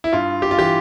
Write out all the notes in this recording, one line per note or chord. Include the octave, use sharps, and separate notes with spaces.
E4
G2 F4
G4
F4
E3 G4